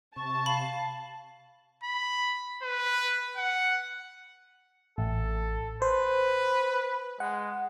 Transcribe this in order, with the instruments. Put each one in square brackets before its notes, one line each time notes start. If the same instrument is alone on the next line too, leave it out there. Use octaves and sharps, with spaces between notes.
[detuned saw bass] C3 [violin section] A5 [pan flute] C#6
[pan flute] F5 [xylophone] B5
[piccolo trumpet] B5
B4
F#5
[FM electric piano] A1 [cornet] A4
[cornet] B4 [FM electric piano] C5
[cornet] G#3 [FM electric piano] F#5